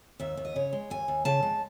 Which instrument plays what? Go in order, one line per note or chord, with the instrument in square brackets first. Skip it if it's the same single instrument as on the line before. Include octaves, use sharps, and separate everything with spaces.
[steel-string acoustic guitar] D#2 E5
D#2
D#5
C#3 C#5
G#3
D#2 G#5
D#2
C#3 A5
G#3